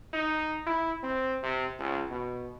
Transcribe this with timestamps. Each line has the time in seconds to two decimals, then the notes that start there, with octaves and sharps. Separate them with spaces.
0.13 D#4
0.67 E4
1.03 C4
1.43 C3
1.79 C#2
2.11 B2